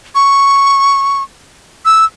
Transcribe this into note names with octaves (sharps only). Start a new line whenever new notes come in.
C#6
E6